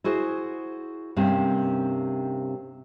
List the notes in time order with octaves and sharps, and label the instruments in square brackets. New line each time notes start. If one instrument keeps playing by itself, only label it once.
[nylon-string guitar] E4 F#4 G#4 C5
G2 C3 A#3 C4 C#4